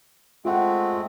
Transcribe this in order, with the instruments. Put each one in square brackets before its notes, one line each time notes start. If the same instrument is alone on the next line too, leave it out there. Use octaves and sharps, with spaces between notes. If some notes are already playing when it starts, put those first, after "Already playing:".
[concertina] G#3 A3 C4 [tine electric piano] F4 F#5